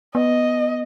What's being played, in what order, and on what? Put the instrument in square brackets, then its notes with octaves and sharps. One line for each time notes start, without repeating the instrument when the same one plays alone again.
[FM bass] B3 [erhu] D#5